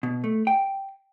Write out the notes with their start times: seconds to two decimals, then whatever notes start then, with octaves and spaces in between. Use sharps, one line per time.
0.03 B2
0.24 A3
0.47 G5